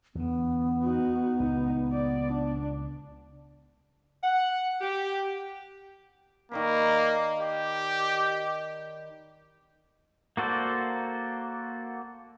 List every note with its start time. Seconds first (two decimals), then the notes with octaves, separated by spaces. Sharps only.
0.15 E2 D3 B3
0.84 D#4 F#4
1.40 C#2 A#2 D#4
1.92 D5
2.28 D4
4.24 F#5
4.81 G4
6.52 D#3 A#3 D5 B5
7.40 G4
10.37 A#3 F#4 A4 C5 D5